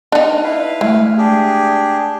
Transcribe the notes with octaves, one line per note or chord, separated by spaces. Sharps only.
D4 D#4
E4 B4 F5
E3 G#3 A3
D4 G4 G#4